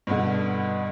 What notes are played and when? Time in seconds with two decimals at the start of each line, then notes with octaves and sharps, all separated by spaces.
0.07 G2 B2 D3